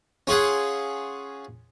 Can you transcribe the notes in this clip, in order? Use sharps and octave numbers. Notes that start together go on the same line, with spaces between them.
C#4 F4 G#4 F#5